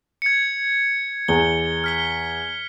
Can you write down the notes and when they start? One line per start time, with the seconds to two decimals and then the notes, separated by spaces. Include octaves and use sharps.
0.22 G#6 C#7
1.28 E2 G7
1.84 F6 B6 G7